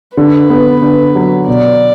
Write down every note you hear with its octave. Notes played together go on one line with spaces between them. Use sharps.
D3 B4
B3
D3
F#3
B2 D5